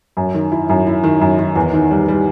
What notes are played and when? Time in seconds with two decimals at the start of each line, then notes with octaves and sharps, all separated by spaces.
0.17 F#2
0.35 D#3
0.52 E4
0.69 F#2
0.87 E4
1.04 D#3
1.21 F#2
1.39 D#3
1.56 E2
1.73 D#3
1.91 G3
2.08 G3